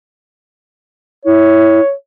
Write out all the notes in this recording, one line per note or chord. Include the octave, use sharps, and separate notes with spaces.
E4 C#5